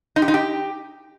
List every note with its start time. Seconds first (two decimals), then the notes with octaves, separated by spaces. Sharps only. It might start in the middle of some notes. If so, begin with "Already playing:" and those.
0.16 D#4
0.22 G4
0.28 D#4
0.34 G4